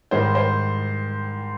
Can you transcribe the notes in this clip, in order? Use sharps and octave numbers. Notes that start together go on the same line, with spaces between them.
G#2 D#3 G3 C5
C5